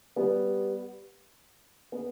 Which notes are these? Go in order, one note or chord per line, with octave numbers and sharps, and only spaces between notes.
G3 B3
B3